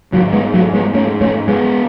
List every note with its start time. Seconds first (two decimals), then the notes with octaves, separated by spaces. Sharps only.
0.12 G#2 D#3 F#3
0.33 G#3 B3
0.54 F#3 A3
0.74 G#3 B3
0.94 G#2 A3 C#4
1.21 A3 C#4
1.48 G#3 B3